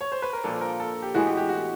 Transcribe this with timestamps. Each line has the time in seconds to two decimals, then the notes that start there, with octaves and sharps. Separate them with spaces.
0.01 C#5
0.12 C5
0.22 B4
0.33 A#4
0.44 A#2 F3 A#3 D4 A4
0.61 A#4
0.80 A4
1.02 G4
1.14 A2 E3 G#3 B3 F#4
1.26 G4
1.37 G4
1.49 F#4